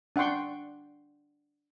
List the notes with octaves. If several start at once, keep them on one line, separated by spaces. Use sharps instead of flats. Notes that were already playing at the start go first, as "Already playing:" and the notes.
D4 F#5 G5 C6 C#6